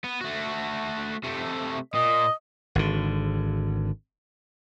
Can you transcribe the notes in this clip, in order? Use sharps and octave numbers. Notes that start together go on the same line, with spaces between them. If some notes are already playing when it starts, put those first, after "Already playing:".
B3
A3 F#4
C3 A3
A#2 D#5
G#1 D3